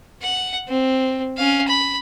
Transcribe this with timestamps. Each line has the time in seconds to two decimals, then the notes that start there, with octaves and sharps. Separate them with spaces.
0.22 F#5
0.68 C4
1.37 C#4 F5
1.68 B5